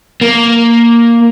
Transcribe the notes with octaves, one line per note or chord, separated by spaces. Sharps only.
A#3